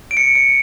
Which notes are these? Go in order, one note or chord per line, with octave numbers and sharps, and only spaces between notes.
D7
C#7
C#7